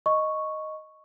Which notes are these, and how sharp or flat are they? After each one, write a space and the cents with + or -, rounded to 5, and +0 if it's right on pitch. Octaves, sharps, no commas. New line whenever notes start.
D#5 +0 C#6 +0